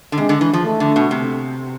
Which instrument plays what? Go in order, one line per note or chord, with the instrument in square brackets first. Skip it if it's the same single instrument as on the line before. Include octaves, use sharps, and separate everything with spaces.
[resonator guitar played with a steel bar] D3
[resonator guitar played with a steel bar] C3 [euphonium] G#3
[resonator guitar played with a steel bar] D3
E3
F3
[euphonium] A3
[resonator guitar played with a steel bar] D3
B2
C3